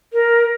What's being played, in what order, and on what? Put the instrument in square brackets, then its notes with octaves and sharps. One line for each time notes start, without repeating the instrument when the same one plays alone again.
[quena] A#4